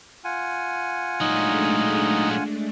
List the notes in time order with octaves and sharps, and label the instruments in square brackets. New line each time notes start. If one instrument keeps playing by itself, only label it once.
[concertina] F4 F#5 G#5
[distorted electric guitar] A#2 F#3 [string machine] G#3 A3 D4 [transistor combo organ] D#4